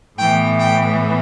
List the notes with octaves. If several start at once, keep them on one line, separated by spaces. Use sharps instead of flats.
A2 E3 B3 G5
G5